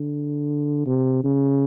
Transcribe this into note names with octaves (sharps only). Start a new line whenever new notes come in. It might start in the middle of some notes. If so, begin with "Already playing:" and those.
Already playing: D3
C3
C#3